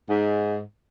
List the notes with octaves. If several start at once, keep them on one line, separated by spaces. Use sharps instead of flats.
G#2